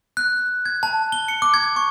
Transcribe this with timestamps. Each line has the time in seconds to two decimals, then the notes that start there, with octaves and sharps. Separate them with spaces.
0.17 F#6
0.66 G#6
0.83 A5
1.12 G7
1.28 C#7
1.42 D6
1.54 G#6
1.76 C#6